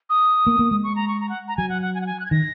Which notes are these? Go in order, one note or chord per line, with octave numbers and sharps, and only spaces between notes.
D#6
A#3
A#3
G#3
C#6
A#5
C#6
A#5
F#5
A#5
F#3 G#5
F#5
F#5
G#5
F#5
G#5
F#6
G#6
D#3 A#6